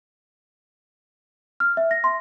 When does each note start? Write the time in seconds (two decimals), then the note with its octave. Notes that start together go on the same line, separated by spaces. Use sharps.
1.60 F6
1.77 E5
1.91 A#6
2.04 C6